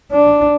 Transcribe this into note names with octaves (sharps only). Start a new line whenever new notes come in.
D4